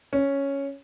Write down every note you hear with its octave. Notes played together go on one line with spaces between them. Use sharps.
C#4